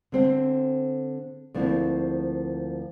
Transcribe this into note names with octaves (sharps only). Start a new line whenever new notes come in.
D3 C4 C5
D2 F3 A#3 C4 E4